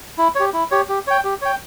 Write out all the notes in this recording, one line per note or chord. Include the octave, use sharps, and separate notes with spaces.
E4
G4 C#5
E4
G4 C#5
G4
C#5 G5
G4
C#5 G5